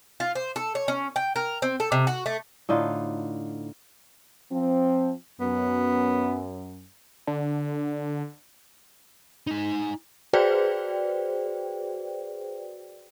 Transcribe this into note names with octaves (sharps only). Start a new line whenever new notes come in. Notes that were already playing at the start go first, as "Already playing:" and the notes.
F4
C5
A4
C#5
C#4
G5
A#4
C4
A4
C3
F#4
A3
A2 D3 D#4 F4
F3 C4
F#2 B3
D3
D#4 G#5
F#4 G#4 B4 C5 D5 G5